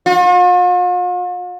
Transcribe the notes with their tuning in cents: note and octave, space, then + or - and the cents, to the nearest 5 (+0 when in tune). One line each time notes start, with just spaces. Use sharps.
F4 +45